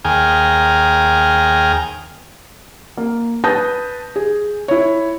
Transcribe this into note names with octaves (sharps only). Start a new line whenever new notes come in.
D#2 G#4 G5 G#5 A#5 F6
A#3
B4 A5 D#6 G6 A#6
G#4
E4 C#5